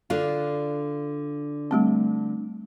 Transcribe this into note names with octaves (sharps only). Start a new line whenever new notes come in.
D3 D4 F4
G3 A3 C4